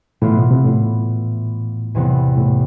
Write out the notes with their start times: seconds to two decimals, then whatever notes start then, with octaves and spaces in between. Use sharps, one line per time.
0.22 A2 E3 B3 F4
0.36 B2
0.51 C3
0.65 A2
1.95 E2 C3 E3 B3
2.37 A2